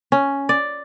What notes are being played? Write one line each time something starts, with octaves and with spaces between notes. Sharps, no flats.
C#4
D5